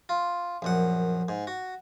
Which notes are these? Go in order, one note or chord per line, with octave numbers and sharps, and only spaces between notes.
F4
A#1 F#2 F#5
G#2
F#4